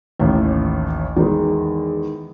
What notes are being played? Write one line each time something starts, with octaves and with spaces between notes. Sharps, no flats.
A1 D#2 A2
E2 D#3 G#3